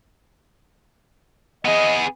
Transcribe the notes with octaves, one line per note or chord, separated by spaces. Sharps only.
B3 G#4 D#5